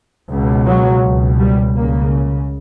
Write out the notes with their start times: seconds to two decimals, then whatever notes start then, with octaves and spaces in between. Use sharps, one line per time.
0.30 C#2 B2
0.66 F#3
1.03 C#2 B2
1.40 G3
1.76 C#2 C#3 A#3